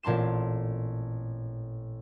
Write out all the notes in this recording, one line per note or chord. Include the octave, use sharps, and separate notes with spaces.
A1 A#2 C4 A5 C6 E7